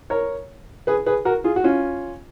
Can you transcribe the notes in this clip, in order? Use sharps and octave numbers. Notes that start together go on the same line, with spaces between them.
A#4 C#5
G#4 B4
G#4 B4
F#4 A#4
F4 G#4
F#4
C#4 F4